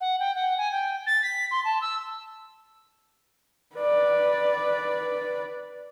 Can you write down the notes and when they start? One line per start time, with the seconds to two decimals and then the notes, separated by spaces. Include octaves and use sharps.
0.01 F#5
0.20 G5
0.35 F#5
0.58 G#5
0.72 G5
1.07 A6
1.23 B6
1.51 C6
1.65 A5
1.82 E6
3.76 B4 D5